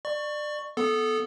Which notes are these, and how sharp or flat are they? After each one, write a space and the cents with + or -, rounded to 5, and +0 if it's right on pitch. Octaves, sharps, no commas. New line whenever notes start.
D5 +25 C#6 +0
B3 +0 A4 -15